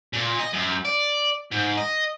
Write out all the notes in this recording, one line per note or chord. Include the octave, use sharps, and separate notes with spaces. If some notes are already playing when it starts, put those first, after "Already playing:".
A#2
D#5
F#2
D5
G#2
D#5